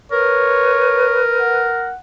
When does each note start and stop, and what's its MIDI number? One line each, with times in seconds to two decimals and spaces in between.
0.12 1.90 70
0.12 1.64 71
0.12 1.21 73
1.40 1.98 78